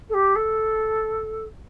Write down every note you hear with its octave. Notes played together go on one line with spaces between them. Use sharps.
A4
G4
A4